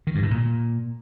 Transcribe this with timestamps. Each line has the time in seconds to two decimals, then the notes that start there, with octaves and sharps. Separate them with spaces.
0.07 D#3
0.15 G2
0.23 A2
0.31 A#2